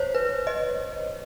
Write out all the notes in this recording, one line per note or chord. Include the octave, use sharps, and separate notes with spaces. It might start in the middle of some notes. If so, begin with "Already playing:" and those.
Already playing: C5 C#5
B4
D#5